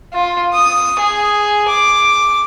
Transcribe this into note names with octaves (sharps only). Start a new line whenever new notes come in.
F4
D#6
G#4
D6